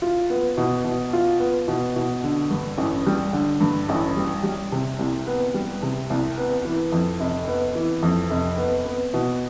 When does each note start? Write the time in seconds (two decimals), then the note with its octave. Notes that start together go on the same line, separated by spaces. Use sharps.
0.02 F4
0.30 B3
0.57 B2
0.84 B2
1.13 F4
1.40 B3
1.68 B2
1.96 B2
2.24 D3
2.51 G2
2.78 A1
3.07 G3
3.33 D3
3.61 G2
3.89 A1
4.16 G3
4.43 G3
4.72 C3
4.99 C2
5.27 B3
5.54 G3
5.82 C3
6.10 C2
6.38 B3
6.65 E3
6.92 F2
7.20 F1
7.48 B3
7.75 E3
8.02 F2
8.30 F1
8.58 B3
8.85 B3
9.14 B2